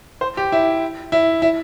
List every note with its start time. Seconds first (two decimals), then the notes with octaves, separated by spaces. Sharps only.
0.21 C5
0.37 G4
0.52 E4
1.12 E4
1.42 E4